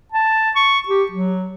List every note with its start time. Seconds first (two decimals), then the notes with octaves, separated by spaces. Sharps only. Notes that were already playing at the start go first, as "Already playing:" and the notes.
0.12 A5
0.56 C#6
0.88 G4
1.12 F#3